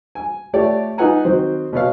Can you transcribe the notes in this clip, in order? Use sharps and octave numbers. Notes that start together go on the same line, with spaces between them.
G#5
A3 F4 G4 C#5 D5
D#4 F4 B4 F#5 G#5 A#5
D#3 F#3 C4 C5
B2 B4 C#5 F5